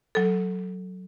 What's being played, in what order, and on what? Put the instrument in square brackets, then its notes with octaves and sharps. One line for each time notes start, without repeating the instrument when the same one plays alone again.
[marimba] F#3 A4